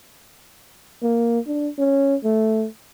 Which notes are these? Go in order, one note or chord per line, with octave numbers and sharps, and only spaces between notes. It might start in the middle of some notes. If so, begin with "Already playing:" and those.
A#3
D4
C#4
A3